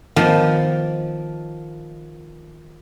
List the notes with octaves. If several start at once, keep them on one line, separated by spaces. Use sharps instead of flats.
D#3 F3 A#3 B3